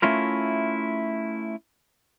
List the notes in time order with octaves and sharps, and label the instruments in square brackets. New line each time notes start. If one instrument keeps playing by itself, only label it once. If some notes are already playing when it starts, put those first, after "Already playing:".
[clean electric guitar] A3 C#4 E4 F4 A#4